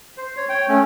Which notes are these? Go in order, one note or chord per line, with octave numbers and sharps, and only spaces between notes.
C5
C#5
C#5 G5
A3 C#4